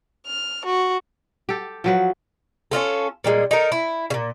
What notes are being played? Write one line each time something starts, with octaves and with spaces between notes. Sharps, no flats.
F6
F#4
G4 A4
F3 F#3 B4
C#4 D#4 F4 A4
A#2 G3 G#3
D#4 A4 A#4
E4
A#2 C#3